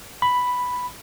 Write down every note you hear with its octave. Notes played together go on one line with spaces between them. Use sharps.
B5